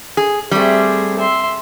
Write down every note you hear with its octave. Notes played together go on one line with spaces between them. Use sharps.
G#4
G3 A3 C4 G#4
E5 C6